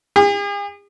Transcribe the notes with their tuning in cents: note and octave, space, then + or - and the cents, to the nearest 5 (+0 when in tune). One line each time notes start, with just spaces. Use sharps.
G#4 -45